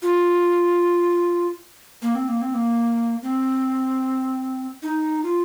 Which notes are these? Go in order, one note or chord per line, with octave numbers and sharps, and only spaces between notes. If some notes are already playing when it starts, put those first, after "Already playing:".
F4
A#3
C4
A#3
C4
A#3
C4
D#4
F4